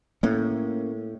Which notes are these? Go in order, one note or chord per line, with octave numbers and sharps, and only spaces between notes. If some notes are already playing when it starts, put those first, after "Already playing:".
A2 A#3 C#4